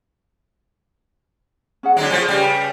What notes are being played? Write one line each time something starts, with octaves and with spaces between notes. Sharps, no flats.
C#4 G#4 F#5
D3 F#3 G#3 C#4 D#4
F3 G#3 A3 G#4 D5
C#3 G3 B4 D5 G#5